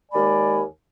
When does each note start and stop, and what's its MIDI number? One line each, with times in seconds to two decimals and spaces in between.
0.12 0.61 39
0.12 0.61 56
0.12 0.61 74
0.12 0.61 80
0.12 0.61 83